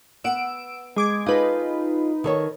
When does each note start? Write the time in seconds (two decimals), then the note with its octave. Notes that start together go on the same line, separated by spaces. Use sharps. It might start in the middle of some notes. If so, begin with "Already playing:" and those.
0.24 B3 F#5 E6 D7
0.96 G#3 D6 G#6
1.26 D#4 F4 G#4 A4 B4
2.24 D#3 A4 C#5